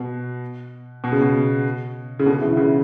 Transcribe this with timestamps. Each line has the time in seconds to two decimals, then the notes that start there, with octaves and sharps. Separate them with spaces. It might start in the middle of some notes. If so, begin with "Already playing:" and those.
Already playing: B2
1.04 B2
1.12 C#3
1.21 B2
2.19 C#3
2.26 B2 D3
2.41 C#3 E3
2.57 C#3 E3